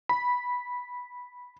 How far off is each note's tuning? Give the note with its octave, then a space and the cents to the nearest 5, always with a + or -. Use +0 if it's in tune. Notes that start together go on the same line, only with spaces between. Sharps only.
B5 -10